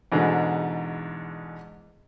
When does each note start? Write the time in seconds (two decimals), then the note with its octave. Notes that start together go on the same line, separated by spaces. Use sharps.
0.12 E2 G#2 B2 D3